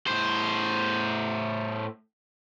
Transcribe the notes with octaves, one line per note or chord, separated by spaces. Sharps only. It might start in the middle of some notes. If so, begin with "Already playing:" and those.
A2 C5